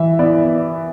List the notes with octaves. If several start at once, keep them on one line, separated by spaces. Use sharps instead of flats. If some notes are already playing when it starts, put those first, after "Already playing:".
Already playing: E3 E5
B3 E4 D5